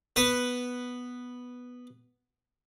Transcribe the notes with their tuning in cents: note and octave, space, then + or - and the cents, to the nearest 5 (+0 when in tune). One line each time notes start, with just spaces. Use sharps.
B3 +0 B4 +0